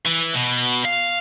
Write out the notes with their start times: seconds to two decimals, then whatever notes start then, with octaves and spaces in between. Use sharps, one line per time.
0.05 E3
0.34 B2
0.85 F5